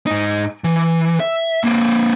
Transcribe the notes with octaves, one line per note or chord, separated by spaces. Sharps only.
G#2 D#4
E3
E5
A#3 C4